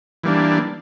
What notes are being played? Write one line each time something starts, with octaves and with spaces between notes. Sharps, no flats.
E3 G3 A#3 D4